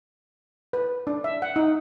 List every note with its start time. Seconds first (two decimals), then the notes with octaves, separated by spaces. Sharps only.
0.73 B4
1.07 D4
1.24 E5
1.42 F#5
1.56 D#4